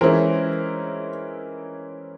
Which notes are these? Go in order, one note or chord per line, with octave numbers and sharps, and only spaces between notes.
E3 G#3 C#4 E4 A#4 C5